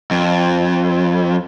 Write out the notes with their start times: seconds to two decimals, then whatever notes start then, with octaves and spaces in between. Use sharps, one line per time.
0.11 F2